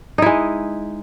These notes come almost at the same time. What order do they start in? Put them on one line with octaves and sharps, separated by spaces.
D#4 E4 G#3